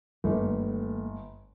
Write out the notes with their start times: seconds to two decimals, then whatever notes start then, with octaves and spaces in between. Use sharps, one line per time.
0.24 G1 D#3 A3 A#3